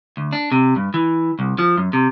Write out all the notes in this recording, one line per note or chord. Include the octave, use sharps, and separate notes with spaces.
D2
D4
C3
G2
E3
C2
F3
F#2
C3